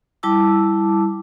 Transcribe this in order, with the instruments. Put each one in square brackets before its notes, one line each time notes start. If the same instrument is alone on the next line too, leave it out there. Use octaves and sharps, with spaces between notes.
[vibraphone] G3 E4 A5 D6 E6